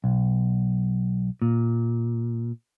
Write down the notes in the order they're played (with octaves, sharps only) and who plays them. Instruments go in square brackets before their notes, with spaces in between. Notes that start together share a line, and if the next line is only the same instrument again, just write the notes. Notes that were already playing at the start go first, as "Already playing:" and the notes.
[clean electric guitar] B1
A#2